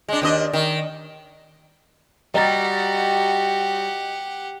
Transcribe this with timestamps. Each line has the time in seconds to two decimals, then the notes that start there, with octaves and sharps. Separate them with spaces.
0.08 G#3 D4
0.22 D#2 D4 D#5
0.53 D#3
2.34 G3 F#4 G4 D#5 F#5 A#5 A6